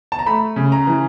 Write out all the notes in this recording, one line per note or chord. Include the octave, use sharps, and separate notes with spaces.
A5
A#5
A3 B5
C#3
A#5
E3